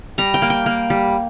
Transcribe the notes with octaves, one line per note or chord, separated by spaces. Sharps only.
G3 A#5
G5
A#3
G5
A#3
G3